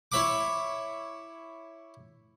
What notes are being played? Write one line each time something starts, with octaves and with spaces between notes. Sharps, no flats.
E4 C#5 E5 B5 D6